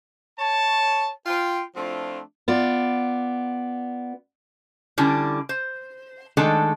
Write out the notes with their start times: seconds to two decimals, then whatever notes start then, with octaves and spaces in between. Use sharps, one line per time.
0.39 C#5 A5
1.26 F4 G5
1.76 F3 A3 C4 D4 E4 F4
2.48 B3 F4 D5
4.98 D3 G3 C#4 D4 E4
5.49 C5
6.37 D#3 G#3 A3 D4 A4